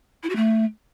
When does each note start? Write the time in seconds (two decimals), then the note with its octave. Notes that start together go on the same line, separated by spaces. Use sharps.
0.23 E4
0.30 F#4
0.36 A3